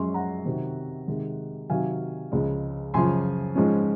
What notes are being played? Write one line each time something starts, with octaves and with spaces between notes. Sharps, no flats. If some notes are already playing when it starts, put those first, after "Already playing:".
Already playing: F#2 F3 G#3 C#4 G#5 C6
F#5 A#5
C3 D#3 F#3 C4
C3 D#3 G#3
C3 D#3 F#3 F5 G#5
C#2 C#3 F3 G#3
F#2 C#3 F3 G#5 C6
G#2 F3 G#3 C#4